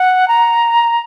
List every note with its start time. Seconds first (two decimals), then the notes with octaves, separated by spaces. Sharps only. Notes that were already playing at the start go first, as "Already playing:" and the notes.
Already playing: F#5
0.28 A#5